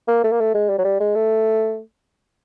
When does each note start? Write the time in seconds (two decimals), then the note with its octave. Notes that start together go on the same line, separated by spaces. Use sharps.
0.08 A#3
0.24 A3
0.32 A#3
0.40 A3
0.54 G#3
0.69 G3
0.78 F#3
0.85 G3
1.00 G#3
1.15 A3